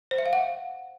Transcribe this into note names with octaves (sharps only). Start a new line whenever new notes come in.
C5
E5
F5
F#5